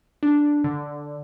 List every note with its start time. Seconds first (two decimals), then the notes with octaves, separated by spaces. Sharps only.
0.23 D4
0.64 D3